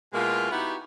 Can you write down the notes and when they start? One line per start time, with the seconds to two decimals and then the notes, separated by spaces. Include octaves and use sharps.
0.13 B2 G#3 A#3 E4 F4
0.51 B3 D#4 E4 F#4 G4 F#5